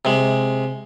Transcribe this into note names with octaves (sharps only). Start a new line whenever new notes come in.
C3 G#3